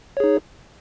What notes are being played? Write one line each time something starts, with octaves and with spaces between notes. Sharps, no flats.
D#4 G#4 C#5